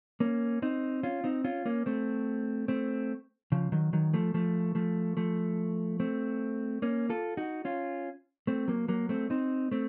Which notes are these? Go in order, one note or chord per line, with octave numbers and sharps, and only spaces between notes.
A#3 C#4
C4 D#4
C#4 F4
C4 D#4
C#4 F4
A#3 C#4
A3 C4
A3 C4
C#3 F3
D#3 F#3
D#3 F#3
F3 A3
F3 A3
F3 A3
F3 A3
A3 C4
A#3 C#4
F4 A4
D#4 F#4
C#4 F4
A3 C4
F#3 A#3
F#3 A#3
A3 C4
C4 D#4
A3 C4